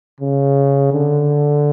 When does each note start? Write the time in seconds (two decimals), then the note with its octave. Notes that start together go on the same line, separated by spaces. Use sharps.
0.20 C#3
0.93 D3